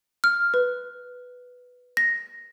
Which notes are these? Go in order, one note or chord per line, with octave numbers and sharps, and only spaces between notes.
F6
B4
A#6